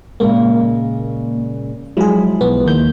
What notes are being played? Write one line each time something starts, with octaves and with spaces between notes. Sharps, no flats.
A#2 C#3 G#3 A#3
F3 F#3 G#3 E4 G#4
B1 B3
D#2 A#3 G6